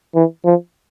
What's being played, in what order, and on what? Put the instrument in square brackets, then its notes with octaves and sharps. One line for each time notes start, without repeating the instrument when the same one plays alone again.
[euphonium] E3
F3